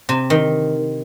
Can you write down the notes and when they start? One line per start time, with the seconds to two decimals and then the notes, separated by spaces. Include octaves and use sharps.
0.09 C3
0.30 D#3